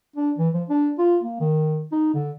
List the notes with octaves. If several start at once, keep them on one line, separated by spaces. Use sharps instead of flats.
D4
E3
F3
D4
F4
A#3
D#3
D#4
D3